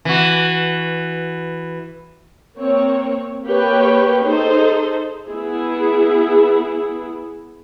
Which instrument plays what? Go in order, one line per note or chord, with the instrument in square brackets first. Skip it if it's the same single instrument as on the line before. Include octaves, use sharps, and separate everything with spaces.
[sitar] E3 F#4
[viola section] A#3 C4 C#5
A#3 G4 B4 C#5 G5
D#4 G#4 A4 C5
B3 E4 G#4